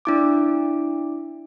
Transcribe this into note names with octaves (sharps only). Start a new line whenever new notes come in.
D4 E4 D6